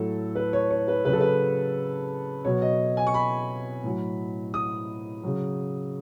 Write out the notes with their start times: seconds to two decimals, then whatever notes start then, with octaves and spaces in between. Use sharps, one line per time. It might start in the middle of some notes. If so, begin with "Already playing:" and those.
Already playing: A2 F#3 A4
0.35 B4
0.53 C#5
0.71 C#5
0.88 B4
1.05 C#3 B4
1.08 F#3
1.13 A4
1.21 B4
2.45 B2 F#3 C#5
2.62 D#5
2.97 G#5
3.07 C#6
3.14 B5
3.84 A2 F#3
4.54 D#6
5.23 C#3 F#3